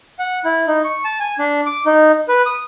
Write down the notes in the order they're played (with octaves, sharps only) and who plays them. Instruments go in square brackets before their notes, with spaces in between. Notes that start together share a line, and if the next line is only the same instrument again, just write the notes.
[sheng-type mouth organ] F#5
E4
D#4
C#6
A5
G#5
D4
D6
D#4
B4
D#6